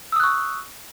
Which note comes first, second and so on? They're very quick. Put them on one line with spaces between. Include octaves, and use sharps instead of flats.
E6 D#6 F#6 C#6